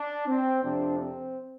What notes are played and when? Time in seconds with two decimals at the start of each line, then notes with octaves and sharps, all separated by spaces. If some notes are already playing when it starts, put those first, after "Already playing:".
Already playing: D4
0.28 C4
0.63 F2 C3 F3 C4 D4
0.99 C4